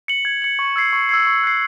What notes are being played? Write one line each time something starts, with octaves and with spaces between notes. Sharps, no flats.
C#7 F#7
G#6
C#7 F#7
C#6
E6 G#6 C7
C#6
E6 G#6 C7
C#6
F#6 C7